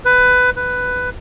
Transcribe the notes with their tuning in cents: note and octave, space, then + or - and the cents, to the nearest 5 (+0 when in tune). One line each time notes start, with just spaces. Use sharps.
B4 +15
B4 +10